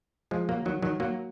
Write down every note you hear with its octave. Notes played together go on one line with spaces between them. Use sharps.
F3 G#3
F#3 A#3
D#3 F#3
D#3 F#3
F#3 A#3